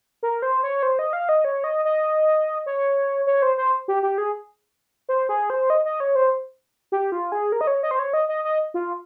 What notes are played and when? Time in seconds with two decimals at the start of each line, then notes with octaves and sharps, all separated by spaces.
0.23 A#4
0.42 C5
0.63 C#5
0.83 C5
0.99 D#5
1.13 F5
1.29 D#5
1.45 C#5
1.64 D#5
1.85 D#5
2.66 C#5
3.27 C#5
3.42 C5
3.58 C5
3.88 G4
4.03 G4
4.18 G#4
5.09 C5
5.29 G#4
5.50 C5
5.70 D#5
5.85 D#5
6.00 C#5
6.15 C5
6.92 G4
7.12 F4
7.32 G#4
7.52 A#4
7.61 D#5
7.67 C#5
7.83 D#5
7.91 C5
7.99 C#5
8.14 D#5
8.29 D#5
8.45 D#5
8.74 F4